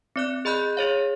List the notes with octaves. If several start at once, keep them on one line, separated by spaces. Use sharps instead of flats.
C4 D5 F#6
G#4 D#5 B5 F#6 G6
G#4 C#5 F5